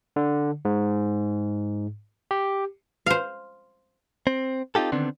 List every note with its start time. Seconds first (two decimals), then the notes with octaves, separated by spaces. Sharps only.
0.16 D3
0.65 G#2
2.31 G4
3.06 C5 F5
4.27 C4
4.75 C4 D#4 F4 G4 A4
4.92 D3 D#3 B3 C4 D4